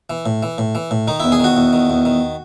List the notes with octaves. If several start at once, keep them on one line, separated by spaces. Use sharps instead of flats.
E3
A2
E3
A2
E3
A2
D#3 D#4
E2 E4
G#4
D#3 F#4
E2
D#3
E2
D#3